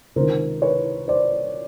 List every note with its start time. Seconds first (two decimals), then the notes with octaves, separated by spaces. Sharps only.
0.16 C#2 C3 D#3 A#4 C5
0.62 B4 C#5
1.08 C5 D5